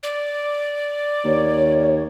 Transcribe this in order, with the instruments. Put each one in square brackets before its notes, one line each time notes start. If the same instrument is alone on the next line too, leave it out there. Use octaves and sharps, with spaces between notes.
[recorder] D5
[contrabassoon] D#2 [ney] C#5